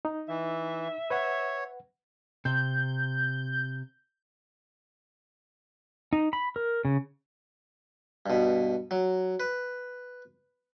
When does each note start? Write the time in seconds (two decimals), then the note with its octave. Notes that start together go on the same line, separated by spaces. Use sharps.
0.05 D#4
0.29 E3 E5
1.10 B4 C#5 F#5
2.45 C3 G6
6.13 D#4
6.33 B5
6.56 A#4
6.85 C#3
8.26 G2 B2
8.91 F#3
9.40 B4